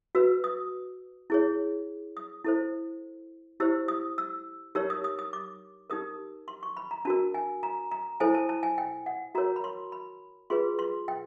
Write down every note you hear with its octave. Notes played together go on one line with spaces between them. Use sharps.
F#4 B4 E6
D#6
E4 G#4 C#5
D#6
E4 A4 C5
E4 G4 C5 E6
D#6
E6
D#4 G4 A#4 C#5 E6
D#6
D#6
D#6
D6
D#4 G4 A#4 D#6
C6
C#6
B5
A#5
D4 F#4 A#4 A5
G#5
A#5
A#5
E4 A4 C5 G#5
A5
A5
G#5
G5
F#5
F#4 A#4 C#5 A#5
B5
C6
B5
F4 G#4 B4 C6
C6
G5